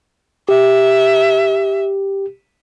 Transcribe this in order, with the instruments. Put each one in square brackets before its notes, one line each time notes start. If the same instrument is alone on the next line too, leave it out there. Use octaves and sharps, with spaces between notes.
[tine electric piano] G4 [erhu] E5